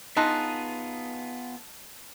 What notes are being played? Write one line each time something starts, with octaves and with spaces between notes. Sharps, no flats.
B3 D#4 F4 G#4 A5 C6 F#6